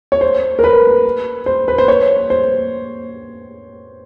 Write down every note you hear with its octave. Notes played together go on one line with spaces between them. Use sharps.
C#5
C5
A#4
B4
C5
B4
C5
C#5
C5